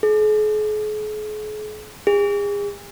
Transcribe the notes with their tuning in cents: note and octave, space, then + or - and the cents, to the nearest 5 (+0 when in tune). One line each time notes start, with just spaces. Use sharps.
G#4 +45
G#4 -35